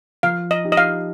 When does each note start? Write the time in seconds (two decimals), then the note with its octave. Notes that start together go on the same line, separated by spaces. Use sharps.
0.23 F3 F5
0.51 D#5
0.65 D#4 G4
0.72 D#5
0.77 F5